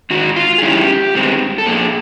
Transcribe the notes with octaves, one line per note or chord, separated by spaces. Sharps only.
G#2 D#3 F#4
F4
G#4
F#2 D#3 G#3 C#4 E4 G4
G2 D#3 G#3 C4
A4
A#2 F3 A#3 G#4